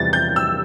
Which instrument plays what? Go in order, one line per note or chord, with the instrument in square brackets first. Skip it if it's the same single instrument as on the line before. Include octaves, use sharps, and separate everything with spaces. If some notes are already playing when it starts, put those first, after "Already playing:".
Already playing: [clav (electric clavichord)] E2 C3 E3 G3 [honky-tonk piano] A6
[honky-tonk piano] G6
E6